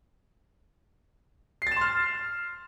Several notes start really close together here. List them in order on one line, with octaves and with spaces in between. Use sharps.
C7 A6 E7 C6 F6